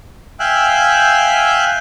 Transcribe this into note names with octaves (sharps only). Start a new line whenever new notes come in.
E5 F5 G5 G#5 E6 F#6